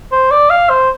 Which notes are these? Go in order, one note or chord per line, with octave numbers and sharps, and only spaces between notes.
C5
D5
F5
C5